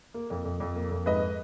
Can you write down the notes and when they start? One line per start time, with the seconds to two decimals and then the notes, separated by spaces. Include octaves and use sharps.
0.14 A#3
0.30 F2
0.45 F2
0.60 F2
0.76 A#3
0.91 F2
1.06 G#2 B4 D#5